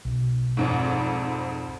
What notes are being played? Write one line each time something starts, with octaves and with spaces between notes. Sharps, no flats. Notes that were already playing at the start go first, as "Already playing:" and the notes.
B1
G#1 F2 G#2